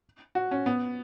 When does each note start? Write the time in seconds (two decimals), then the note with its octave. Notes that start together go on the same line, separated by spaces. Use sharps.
0.35 F#4
0.51 C#4
0.66 B3